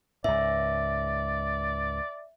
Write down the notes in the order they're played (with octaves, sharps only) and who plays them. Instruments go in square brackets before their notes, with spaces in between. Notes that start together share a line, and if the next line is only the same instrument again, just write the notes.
[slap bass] C#2 G#2 [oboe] D5 [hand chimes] E5